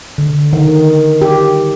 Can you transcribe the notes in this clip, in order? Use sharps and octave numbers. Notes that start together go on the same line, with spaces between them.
D3
D#3
G4